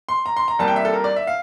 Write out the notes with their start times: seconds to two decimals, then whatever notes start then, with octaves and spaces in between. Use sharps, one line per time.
0.09 C6
0.26 A#5
0.37 C6
0.48 A#5
0.59 C2 C3 G3 A#3 A5
0.68 G5
0.76 E5
0.85 A4
0.93 A#4
1.04 D5
1.16 E5
1.27 F5